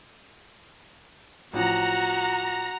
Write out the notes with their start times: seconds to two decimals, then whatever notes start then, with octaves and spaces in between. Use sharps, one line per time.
1.54 A1 F3 F#4 F#5 A#5